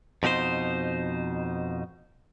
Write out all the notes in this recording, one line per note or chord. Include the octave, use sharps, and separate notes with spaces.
F2 B2 D#4 G4 C5